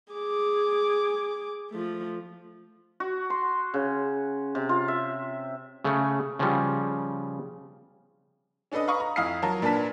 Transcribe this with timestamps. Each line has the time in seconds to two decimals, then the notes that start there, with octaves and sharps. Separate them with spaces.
0.13 G#4 D6
1.71 F3 A3
3.00 F#4
3.30 C6
3.74 C#3
4.55 C3
4.69 F4
4.88 E5
5.84 C#3 A3
6.39 C#3 F3 G3
8.72 C#4 D4 A4 B4 D#5
8.88 B4 F5 A#5 B5 C#6 D#6
9.00 A#5
9.16 F2 E4 F5 D#6 F6 C7
9.42 F#3 F4 F#4 A#4 C#5 A5
9.62 A#2 D4 A#4 B4 A5 B6